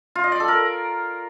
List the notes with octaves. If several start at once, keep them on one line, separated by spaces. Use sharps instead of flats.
F4
D#5
D5
A4
A#4